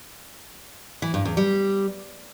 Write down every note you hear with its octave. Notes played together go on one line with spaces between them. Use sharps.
E3
G2
E2
G3